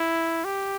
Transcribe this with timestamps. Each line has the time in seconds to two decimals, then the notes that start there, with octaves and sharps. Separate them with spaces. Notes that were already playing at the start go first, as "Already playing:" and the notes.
Already playing: E4
0.45 G4